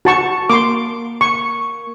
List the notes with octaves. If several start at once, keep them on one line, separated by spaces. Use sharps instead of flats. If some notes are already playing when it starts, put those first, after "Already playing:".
F#4 A5 C#6
A#3 C6 D6
C#6